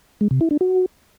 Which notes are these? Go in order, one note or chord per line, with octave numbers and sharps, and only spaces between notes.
G#3
C3
E4
D4
F#4